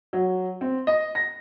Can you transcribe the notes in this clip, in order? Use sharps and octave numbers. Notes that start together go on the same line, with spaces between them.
F#3
C4
D#5
A#6